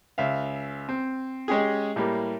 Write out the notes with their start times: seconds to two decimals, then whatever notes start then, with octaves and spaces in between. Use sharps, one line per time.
0.18 C#2 E5 F5
0.89 C4
1.48 G#3 C#4 G4 G#4
1.96 A2 G3 A#3